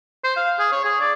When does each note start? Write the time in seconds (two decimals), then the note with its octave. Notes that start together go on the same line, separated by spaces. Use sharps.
0.24 C5
0.36 F5
0.59 G#4
0.72 C#5
0.85 G#4
1.01 D5